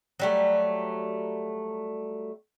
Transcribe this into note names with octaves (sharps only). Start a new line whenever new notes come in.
F#3 G3 A3